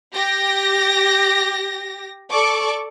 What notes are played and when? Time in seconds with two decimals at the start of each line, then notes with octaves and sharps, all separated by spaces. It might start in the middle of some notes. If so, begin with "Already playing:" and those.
0.14 G4 A#6
2.31 A4 D5 C#6 D6